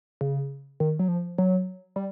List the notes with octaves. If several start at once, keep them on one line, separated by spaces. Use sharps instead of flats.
C#3
D#3
F#3
F3
F#3
G3